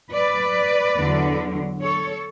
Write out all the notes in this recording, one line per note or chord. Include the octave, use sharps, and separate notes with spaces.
B4 D5
E2 D3 F#3
A4 C#5